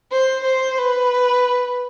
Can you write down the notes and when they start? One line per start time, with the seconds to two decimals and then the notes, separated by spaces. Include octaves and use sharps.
0.12 C5
0.45 C5
0.78 B4